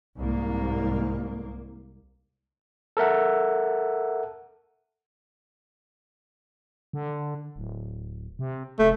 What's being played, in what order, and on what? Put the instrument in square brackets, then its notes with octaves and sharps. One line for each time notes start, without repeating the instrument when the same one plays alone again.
[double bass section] C2 G#2 A#3
[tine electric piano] A4 A#4 E5 F#5
[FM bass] D3
D1
C3
[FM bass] F1 [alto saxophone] A3